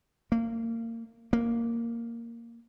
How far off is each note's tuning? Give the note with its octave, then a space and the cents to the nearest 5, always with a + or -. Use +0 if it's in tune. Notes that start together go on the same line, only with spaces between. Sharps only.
A#3 -30
A#3 -5